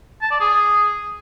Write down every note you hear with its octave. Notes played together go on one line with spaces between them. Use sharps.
A5
D5
G#4